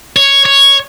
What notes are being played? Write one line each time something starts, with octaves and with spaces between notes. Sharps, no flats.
C#5
C#5